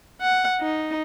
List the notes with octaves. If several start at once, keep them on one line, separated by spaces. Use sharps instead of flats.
F#5
D#4